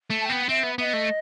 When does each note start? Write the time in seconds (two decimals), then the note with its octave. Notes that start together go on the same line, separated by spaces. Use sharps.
0.10 A3
0.20 A5
0.25 B3 G5
0.49 C4 E5
0.64 B3
0.78 B3 E5
0.83 D#5
0.93 A3